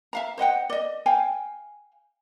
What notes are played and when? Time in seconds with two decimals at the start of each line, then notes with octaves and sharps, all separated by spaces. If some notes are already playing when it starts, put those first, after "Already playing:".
0.13 E5 F5 A#5
0.38 C5 D#5 F#5 G5
0.70 D5 D#5
1.06 F5 G5 G#5